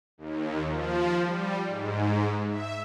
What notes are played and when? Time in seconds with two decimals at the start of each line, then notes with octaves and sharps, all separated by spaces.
0.18 D#2
0.68 F3
1.25 G3
1.66 G#2
2.50 E5